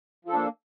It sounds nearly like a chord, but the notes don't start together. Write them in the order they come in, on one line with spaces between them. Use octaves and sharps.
F3 A4 D4 A#3